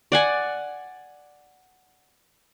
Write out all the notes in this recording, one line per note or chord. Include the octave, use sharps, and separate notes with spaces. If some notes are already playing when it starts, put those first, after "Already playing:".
D5 F#5 G#5